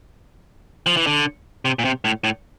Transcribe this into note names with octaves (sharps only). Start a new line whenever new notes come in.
F3
E3
D3
C3
A#2
C3
A2
A2